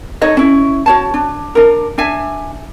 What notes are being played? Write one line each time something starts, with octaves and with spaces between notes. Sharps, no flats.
D#4 A4 C#5 D#5
C#4 E4
F#4 C#5 A5
D4
D4 A#4
D4 E5 G#5